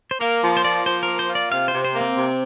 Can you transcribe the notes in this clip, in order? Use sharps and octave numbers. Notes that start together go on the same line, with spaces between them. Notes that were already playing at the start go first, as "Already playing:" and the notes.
C5
A#3 A#4
F3
C5
A#3 D5
F3 C5
A#4
A#3
C5
F4
D5
C3 F5
C5
C3
C5
A#3
C4
C3